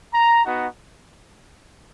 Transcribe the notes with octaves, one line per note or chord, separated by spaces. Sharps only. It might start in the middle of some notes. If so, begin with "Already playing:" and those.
A#5
B3 D#4 F#4